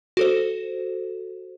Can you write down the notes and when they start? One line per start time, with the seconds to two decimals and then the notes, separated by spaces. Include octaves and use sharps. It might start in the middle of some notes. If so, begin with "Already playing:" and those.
0.17 F#4 A4 C5